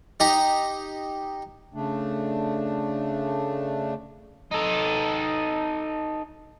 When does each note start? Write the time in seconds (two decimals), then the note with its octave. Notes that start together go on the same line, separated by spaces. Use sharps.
0.20 D#4 G4 A#5
1.74 C#3 A3 D4
4.51 D#4 A4